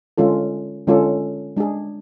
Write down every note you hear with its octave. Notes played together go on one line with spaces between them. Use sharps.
D3 G#3 C#4 F4 A4
D3 G#3 C#4 F4 A4
G#3 D4 G#4